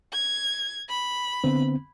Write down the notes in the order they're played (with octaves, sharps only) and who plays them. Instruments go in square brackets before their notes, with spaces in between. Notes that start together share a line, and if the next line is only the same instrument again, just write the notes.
[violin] G#6
B5
[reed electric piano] D3 B3 C4